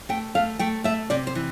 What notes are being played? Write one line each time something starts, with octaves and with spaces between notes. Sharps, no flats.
A3 G5
A3 F5
A3 G5
A3 E5
C3 D5
C5
E3